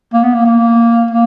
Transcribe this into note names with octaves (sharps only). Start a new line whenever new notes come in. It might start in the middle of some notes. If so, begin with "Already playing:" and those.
A#3
B3
A#3
A#3
A#3